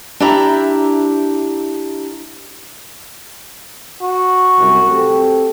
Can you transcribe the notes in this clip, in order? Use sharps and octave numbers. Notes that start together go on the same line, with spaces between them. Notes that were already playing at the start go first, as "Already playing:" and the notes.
D4 E4 G4 E5 A#5
F#4
C2 F#2
A3 C4 G4